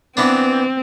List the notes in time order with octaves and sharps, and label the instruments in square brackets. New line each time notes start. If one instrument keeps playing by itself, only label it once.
[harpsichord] E3 B3 D4 [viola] C4